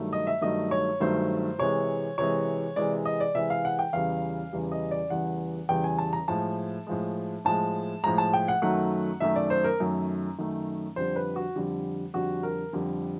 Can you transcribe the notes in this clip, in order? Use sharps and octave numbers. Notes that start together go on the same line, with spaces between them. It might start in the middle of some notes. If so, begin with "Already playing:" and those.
Already playing: G2 D#3 F#3 A3
D#5
E5
G2 D#3 F#3 A3 D#5
C#5
G2 D#3 F#3 A3 C5
C3 E3 G#3 C#5
C3 E3 G#3 C#5
C3 E3 G#3 D5
D#5
D5
C3 E3 G#3 E5
F5
F#5
G5
E2 C#3 E3 G3 F5
E2 C#3 E3 G3
D#5
D5
E2 C#3 E3 G3 F#5
E2 C#3 E3 G3 G5
G#5
A5
A#5
A2 F3 G#3 A5
A2 F3 G#3
A2 F3 G#3 A5
A2 F3 G#3 A#5
A5
G5
F#5
F#2 D#3 F#3 A3 F#5
F#2 D#3 F#3 A3 E5
D5
C5
A#4
F#2 D#3 F#3 A3
F#2 D#3 F#3 A3
F2 D3 G3 C5
B4
F#4
F2 D3 G3
F2 D3 G3 F#4
A#4
F2 D3 G3